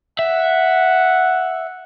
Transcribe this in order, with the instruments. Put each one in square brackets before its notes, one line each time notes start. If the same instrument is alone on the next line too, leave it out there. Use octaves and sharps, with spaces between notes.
[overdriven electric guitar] E5 [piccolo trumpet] F#5